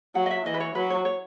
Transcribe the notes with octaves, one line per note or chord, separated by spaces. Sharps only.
F#3 F#5
D#5
E5
E3 D#5
B4
C#5
F#3 B4
C#5
C#5